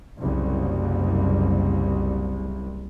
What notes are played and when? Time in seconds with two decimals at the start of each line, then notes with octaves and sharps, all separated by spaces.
0.17 F#1 C2